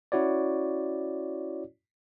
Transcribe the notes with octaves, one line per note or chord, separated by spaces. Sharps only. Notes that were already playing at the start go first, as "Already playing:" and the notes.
C#4 E4 F#4 C#5 D5